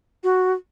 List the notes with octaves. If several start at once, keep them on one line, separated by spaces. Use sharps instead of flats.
F#4